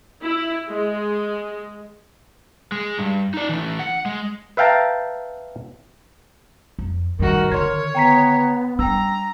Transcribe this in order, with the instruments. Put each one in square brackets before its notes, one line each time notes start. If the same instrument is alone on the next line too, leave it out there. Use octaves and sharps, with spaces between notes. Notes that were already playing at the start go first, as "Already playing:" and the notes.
[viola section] E4
G#3
[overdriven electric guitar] G#3
G2
D#4 D5
A2 E3
F#5
G#3
[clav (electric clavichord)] B4 E5 F5 G5 A5 A#5
[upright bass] F2
[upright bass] F1 G2 [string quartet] D#3 F#4 [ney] A#4
[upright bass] D3 D#3 [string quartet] C#5 [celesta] C6 G#6
[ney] B3 [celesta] G5 A#5 B6
[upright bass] G3 D4 [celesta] G5 E6 [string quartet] A#5